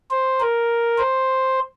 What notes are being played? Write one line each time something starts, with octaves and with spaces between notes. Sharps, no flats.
C5
A#4
C5